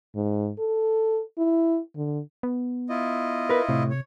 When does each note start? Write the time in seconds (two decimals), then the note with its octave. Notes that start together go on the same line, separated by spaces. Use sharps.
0.15 G#2
0.59 A4
1.38 E4
1.96 D3
2.43 B3
2.89 E4 F4 D#5
3.49 A#4 B4
3.69 A2 C3
3.90 C#5